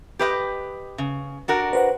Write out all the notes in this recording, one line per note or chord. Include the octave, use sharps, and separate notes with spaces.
G4 B4 D#5
C#3
D4 F#4 A#4
B4 C5 F#5